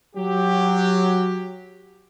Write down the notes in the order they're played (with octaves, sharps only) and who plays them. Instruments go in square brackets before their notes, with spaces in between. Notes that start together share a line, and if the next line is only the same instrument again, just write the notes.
[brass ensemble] F#3 G4